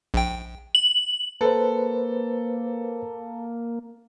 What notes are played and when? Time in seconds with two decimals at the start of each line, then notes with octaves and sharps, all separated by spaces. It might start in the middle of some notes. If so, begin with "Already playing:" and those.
0.14 A#1 G5
0.75 F#7
1.41 A#3 A4 B4 C5